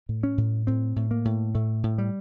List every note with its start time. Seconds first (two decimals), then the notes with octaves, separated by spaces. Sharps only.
0.09 A2
0.23 C#4
0.38 A2
0.67 A2 C4
0.96 A2
1.11 A#3
1.25 A2
1.55 A2 A3
1.83 A2
1.98 G3